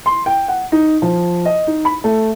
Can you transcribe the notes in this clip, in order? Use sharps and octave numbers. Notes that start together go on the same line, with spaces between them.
C6
G5
F#5
D#4
F3
D#5
D#4
B5
A3